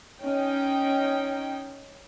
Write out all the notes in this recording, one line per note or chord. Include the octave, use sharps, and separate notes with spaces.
C#4 D#4 G5